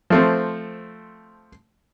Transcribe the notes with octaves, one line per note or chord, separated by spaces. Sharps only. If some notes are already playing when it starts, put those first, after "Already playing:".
F3 A3 C4